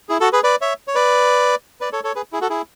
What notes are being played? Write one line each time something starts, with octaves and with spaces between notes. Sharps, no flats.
E4 G#4
F#4 A4
G#4 B4
B4 D5
C#5 E5
C#5
B4 D5
B4 D5
A4 C#5
A4 C#5
G#4 B4
E4 G#4
F#4 A4
E4 G#4